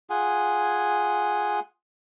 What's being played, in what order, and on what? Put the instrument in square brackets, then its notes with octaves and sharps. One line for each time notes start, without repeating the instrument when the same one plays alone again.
[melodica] F4 G#4 F#5 G#5